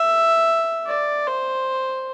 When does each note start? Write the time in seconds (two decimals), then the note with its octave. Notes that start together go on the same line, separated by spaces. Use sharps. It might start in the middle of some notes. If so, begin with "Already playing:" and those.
Already playing: E5
0.87 D5
1.27 C5